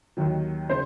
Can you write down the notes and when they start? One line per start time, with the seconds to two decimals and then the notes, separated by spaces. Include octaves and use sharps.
0.17 D#2 D#3 F#3
0.69 C#3 C5